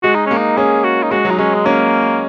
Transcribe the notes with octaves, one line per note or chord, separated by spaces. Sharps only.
G#3 F#4
D#4
A#3 C#4
D#4
C#4 G#4
F#4
D#4
G#3 F#4
F#3
D#4
G#3 C#4
G#3
A#3 C#4